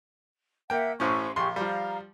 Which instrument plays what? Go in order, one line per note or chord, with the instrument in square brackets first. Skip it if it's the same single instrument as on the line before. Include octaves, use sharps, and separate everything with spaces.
[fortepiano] A#3 G5 [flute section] E5 F#5
[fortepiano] A1 A2 C#4 [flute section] C5 C6 C#6
[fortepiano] A#1 C6 [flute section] G4 G#4 C#6
[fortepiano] F3 G3 [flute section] F5 A#5